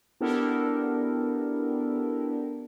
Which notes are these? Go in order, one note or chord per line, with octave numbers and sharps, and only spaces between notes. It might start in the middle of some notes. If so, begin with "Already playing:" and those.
B3 D4 E4 G4 A4 A#4